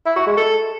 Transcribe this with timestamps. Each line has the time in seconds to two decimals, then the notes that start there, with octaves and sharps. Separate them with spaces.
0.06 E4
0.16 F#4
0.26 G#3
0.37 A4